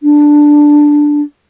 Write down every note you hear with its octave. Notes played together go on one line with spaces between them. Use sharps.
D4